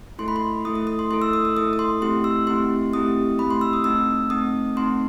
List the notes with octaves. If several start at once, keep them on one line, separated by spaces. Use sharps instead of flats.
A3 E4 A4 C6
B5
C6
A3 E4 A4 D#6
D#6
D#6
C6
A3 E4 A4 C6
E6
D#6
E6
A3 E4 A4 D#6
D#6
C6
A3 C4 E4 G4 C6
E6
A3 C4 E4 G4 C6
A3 C4 E4 G4 D#6
A3 C4 E4 G4 B5
C6
E6
D#6
A3 C4 D#4 E6
A3 C4 D#4 D#6
A3 C4 D#4 C6